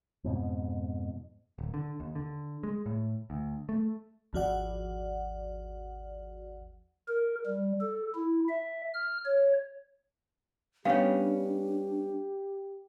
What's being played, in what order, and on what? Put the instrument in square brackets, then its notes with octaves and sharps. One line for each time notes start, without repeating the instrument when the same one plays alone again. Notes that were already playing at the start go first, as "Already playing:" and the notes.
[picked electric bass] F2 G#2 B2
D1
D3
D#2
D3
G#3
A2
D2
A3
[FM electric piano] G#1 D#2 F3 F#4 D5 F#5
[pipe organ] A#4
G3
A4
E4
E5
F6
C#5
[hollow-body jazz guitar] G3 B3 C#4 [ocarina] D4 [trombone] G4 [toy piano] C#5 F5